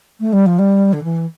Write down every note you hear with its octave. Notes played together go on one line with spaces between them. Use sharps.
A3
G3
F3
G3
D3
E3